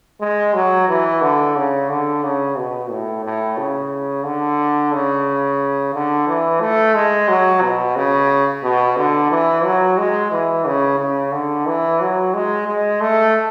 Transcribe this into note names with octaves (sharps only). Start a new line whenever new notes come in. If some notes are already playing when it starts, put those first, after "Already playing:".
G#3
F#3
E3
D3
C#3
D3
C#3
B2
A2
A2
C#3
D3
C#3
D3
E3
A3
G#3
F#3
B2
C#3
B2
D3
E3
F#3
G#3
E3
C#3
C#3
D3
E3
F#3
G#3
G#3
A3